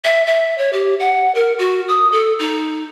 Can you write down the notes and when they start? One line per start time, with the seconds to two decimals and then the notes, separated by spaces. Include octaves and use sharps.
0.04 E5
0.26 E5
0.58 C#5
0.72 G4
0.99 F#5
1.34 A#4
1.58 F#4
1.88 D#6
2.12 A4
2.39 D#4